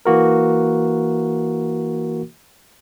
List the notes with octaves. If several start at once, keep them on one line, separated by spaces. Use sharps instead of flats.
E3 A#3 F#4 A#4